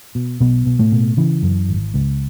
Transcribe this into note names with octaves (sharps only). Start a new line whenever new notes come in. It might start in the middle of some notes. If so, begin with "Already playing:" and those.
B2
B1 B2 B3
B2
A2 A3
B2
C#3 E3
F#2
G#1
C#2